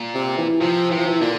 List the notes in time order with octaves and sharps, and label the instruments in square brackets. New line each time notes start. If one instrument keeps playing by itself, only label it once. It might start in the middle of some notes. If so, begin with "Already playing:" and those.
Already playing: [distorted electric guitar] A#2
[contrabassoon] C3
E3
[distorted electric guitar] C3 [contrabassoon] F3
[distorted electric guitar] C3 [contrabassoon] E3
[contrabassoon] F3
E3
[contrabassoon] A#2 [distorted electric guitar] D3